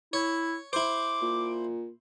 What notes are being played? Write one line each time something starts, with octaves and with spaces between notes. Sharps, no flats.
E4 C#5
E4 C5 D6
A#2